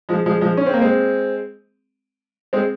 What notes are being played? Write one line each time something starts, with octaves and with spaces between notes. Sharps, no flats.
F3 G#3
F3 G#3
F3 G#3
C#4
C4
A#3
G#3 C4
G#3 C4